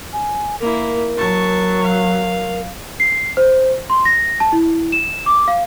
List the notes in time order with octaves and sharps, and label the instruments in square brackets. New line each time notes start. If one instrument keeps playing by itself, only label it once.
[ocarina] G#5
[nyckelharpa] A#3 E4 [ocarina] A#4
[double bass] F#3 [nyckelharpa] A5 C#6
[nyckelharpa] F5
[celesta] C7
C5
C6
A#6
A5
E4
E7
D6
F5